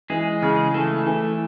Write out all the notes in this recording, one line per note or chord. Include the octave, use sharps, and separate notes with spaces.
E3 G#3 G#4
C#3
E3 A3 A4
E3